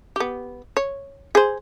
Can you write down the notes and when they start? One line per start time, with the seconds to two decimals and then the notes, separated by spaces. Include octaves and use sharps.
0.16 B3 G4
0.77 C#5
1.35 G#4 C5